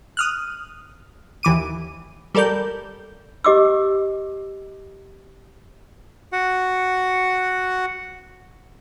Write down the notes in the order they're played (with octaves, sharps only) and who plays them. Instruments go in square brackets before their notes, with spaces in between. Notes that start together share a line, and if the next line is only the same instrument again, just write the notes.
[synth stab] D#6 F6 F#6
D#2 E3 D6 D#7
G3 A4 A#4 D5 G6
[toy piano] G4 D#5 D6 E6
[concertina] F#4 F#5